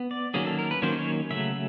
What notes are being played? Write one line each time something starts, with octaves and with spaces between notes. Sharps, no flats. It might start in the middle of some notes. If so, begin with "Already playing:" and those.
Already playing: B3
D5
D#3 F#3 A#3 C#4 G#4
A4
A#4
B4
D#3 F#3 A#3 C#4 C5
C#5
C#3 F#3 A3 E5